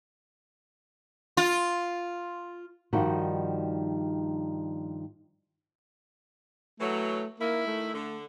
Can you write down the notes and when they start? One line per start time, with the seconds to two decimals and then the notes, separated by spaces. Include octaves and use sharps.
1.37 F4
2.93 G2 D#3 F3 G3 D#4 F#4
6.80 E3 F#3 A3
7.40 D#3 A#3 E4
7.67 A3
7.94 D3